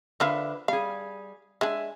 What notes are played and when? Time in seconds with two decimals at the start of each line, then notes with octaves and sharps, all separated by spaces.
0.20 D3 F3 A#4 B4 E5 F5
0.68 G3 G#4 F5
1.61 G#3 D4 E5 G#5